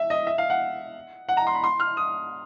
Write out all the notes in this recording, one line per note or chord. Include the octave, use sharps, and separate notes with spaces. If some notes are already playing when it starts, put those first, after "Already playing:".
Already playing: E5
D#5
E5
F5
F#5
F#5
A#5
C6
B5
C6
F6
D#6